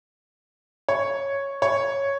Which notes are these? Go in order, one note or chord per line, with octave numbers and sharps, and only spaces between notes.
C#5
C#5